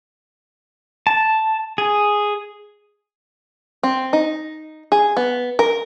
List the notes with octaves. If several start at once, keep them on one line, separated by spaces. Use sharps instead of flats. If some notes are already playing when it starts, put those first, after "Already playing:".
A5
G#4
C4
D#4
G#4
B3
A#4